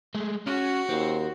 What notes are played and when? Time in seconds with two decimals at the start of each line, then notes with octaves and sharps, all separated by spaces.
0.15 G#3 A3
0.47 C#4 F#4
0.89 D#2 C4